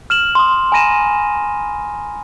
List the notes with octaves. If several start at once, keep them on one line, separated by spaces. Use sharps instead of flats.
F6 E7 F#7
C6 D#6
G#5 A#5 B5 A#6 D#7 E7